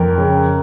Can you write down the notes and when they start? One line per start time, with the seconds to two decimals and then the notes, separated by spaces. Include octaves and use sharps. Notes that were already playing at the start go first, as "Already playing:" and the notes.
Already playing: F2 A#4
0.18 C#3